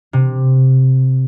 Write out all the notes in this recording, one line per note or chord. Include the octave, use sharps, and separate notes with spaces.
C3